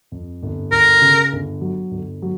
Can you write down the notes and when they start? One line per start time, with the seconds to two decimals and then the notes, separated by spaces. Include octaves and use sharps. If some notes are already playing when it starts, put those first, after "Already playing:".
0.12 F2
0.42 G1
0.72 G1 A#4
1.02 C#3
1.33 G1
1.61 F#3
1.91 G1
2.22 F#3